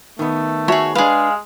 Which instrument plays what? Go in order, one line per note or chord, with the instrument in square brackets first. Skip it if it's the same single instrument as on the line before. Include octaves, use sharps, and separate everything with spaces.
[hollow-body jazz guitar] D#3 B3 [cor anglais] A3
[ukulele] F#4 E5 A5 [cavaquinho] G#4 C#5
[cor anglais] G#3 [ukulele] D4 B4 [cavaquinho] G#4 F5